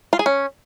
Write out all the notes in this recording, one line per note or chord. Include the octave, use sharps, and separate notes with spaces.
F4
G#4
C#4